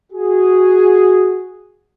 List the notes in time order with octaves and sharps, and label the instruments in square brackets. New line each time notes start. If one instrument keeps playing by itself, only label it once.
[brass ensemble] F#4 G#4